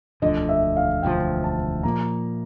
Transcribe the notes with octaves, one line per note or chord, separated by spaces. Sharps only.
E1 D2 D3 F3 D#5
E5
F5
E1 D2 D3 F3 G5
A5
A#2 F3 A#3 A#5